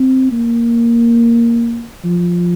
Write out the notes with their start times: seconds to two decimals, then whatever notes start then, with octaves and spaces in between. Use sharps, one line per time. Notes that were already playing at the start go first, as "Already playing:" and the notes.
Already playing: C4
0.32 A#3
2.05 F3